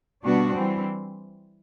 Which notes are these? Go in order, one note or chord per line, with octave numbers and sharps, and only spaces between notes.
B2 G3 B3 D4 F#4
E3 G3 C4